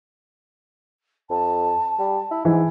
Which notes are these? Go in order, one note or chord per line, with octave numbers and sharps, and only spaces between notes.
F2 A5
G3
E4
G#2 E3